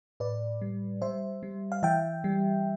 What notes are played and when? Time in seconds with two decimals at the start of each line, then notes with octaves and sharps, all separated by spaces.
0.20 A2 B4 D5
0.62 G3
1.02 G3 C5 E5
1.43 G3
1.72 F5
1.83 E3 E5 G5
2.24 G3